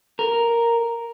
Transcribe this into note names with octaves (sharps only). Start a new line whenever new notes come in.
A#4